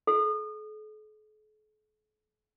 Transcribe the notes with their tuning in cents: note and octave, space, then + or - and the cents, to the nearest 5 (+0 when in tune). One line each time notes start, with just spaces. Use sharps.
A4 -45